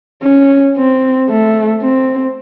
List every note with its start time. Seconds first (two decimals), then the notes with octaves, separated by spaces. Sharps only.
0.23 C#4
0.77 C4
1.30 A3
1.82 C4